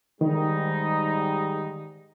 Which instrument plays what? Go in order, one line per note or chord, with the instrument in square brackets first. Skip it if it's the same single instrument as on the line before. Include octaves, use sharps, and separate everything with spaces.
[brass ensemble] G#2 G3 D#4 [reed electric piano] D#3